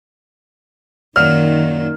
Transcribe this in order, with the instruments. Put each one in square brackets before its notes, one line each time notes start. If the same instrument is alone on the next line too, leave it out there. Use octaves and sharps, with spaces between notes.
[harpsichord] F#2 A#2 F#3 [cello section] D#3 [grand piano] F6